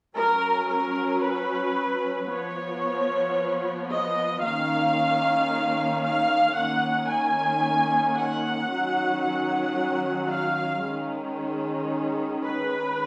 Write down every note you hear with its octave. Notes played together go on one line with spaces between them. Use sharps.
F#3 C#4 A#4
A#4
B4
F3 B3 C#5
D#5
D#3 A#3 C#4 F5
F5
D#3 A#3 C#4 F#5
G#5
F#5
D#3 F#3 C#4
F#5
F5
D#3 G#3 C#4
B4